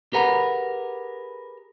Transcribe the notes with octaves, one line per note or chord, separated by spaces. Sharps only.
G4 G#4 A#4 B4 F#5 A#5